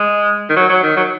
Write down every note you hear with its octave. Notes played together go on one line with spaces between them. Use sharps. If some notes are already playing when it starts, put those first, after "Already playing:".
Already playing: G#3
D#3
F#3
F#3
D#3
F#3